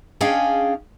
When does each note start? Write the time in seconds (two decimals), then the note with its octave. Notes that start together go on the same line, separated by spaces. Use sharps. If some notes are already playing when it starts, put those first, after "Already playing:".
0.21 C#4 D4 G#4 D#5 F5 G5